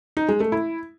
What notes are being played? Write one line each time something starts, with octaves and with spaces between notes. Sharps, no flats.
D#4
G#3
A3
E4